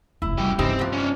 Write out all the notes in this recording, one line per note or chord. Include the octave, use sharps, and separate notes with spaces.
F1 F2 E4
F#2 B2 G3 G4
G2 C#3 E3 C4 D#4 G4
G#2 F3
C#4 D4